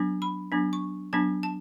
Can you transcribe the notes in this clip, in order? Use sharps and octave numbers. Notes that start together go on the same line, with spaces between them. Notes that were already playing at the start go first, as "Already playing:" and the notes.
Already playing: F#3 B3 D4
B5
F#3 B3 D4
C#6
F#3 B3 D4 A5
A5